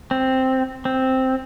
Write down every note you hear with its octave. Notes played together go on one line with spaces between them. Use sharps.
C4
C4